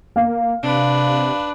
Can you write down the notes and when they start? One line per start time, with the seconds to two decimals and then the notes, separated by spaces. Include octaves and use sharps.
0.16 A#3 F5
0.63 C3 D4 B4